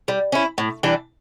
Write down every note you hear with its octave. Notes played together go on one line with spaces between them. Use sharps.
G3
C#4 E4
A2
E3 G3 D4